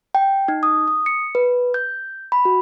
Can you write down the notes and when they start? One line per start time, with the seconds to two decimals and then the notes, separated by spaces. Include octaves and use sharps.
0.15 G5
0.48 D#4
0.63 D#6
0.87 D#6
1.06 C#7
1.35 B4
1.74 G6
2.32 B5
2.45 F#4